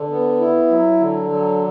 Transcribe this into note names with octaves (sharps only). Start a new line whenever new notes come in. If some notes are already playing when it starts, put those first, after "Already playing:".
Already playing: D3
B3
E4
F#3
D3
F#3